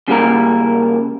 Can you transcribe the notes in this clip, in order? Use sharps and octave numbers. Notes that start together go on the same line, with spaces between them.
C#3 G3 A#3 A#4